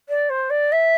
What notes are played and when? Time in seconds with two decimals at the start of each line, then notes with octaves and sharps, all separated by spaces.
0.09 D5
0.30 C5
0.50 D5
0.72 E5